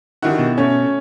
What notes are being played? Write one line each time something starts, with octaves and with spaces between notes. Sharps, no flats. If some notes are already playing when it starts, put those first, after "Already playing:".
D3 D#3 E4 F#4 G4
B2
A3 C#4